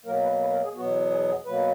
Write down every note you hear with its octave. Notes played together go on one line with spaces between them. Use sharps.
B2 F#3 A#3 A#4
B4
B4
A#4
G#4
E2 B2 F#3 B3 F#4
G#4
G#4
B2 F#3 A#3 B4